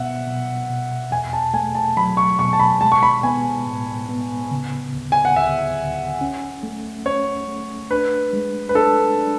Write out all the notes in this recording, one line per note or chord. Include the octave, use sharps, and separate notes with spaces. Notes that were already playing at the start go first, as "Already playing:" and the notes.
Already playing: B2 B3 E5 F#5
B2
B2
E2 G#5
A5
A3 G#5
A5
F#3 B5
C#6
B2 C#6
A5
B5
G#3 A5
C#6
B5
B3 G#5
A2
B3
C#3
D2
G#5
F#5
D2 E5
D2
C#4
A3
C#4 C#5
A3
D4 B4
G#3
B4
D4 A4
D4